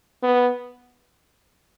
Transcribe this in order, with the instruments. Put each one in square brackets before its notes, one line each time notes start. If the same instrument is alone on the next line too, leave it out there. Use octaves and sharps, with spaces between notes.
[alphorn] B3